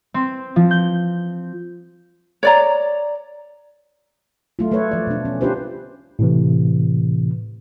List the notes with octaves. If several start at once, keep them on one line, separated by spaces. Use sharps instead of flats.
C4
F3
G6
C#5 D5 A#5
F#3 A3 F4
A3 A4 B4 C#5
F3 D5
B2 D4
C#4
C#4 D4 F4 G4 B4 C5
A2 C3 E3